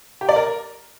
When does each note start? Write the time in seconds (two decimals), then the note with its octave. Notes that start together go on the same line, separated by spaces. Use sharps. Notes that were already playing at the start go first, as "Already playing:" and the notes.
0.21 G4
0.29 D5
0.36 A#4